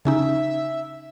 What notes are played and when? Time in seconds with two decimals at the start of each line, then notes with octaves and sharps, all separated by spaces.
0.05 C#3 C#4 D#4 E5